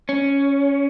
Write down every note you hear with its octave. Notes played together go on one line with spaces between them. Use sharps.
C#4